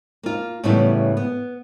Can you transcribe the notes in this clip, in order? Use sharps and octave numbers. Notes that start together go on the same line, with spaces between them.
A#3 F4
A2 C#3 E3 G3 B3 E4
B3